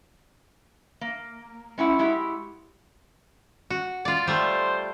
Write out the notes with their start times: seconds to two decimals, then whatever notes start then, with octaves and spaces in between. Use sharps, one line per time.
1.01 A#3
1.78 G#3 C#4 E4 F#5
1.99 G#3 E4 F#4 G4
3.70 F#4
4.05 F4 D5
4.27 G3 A3 C5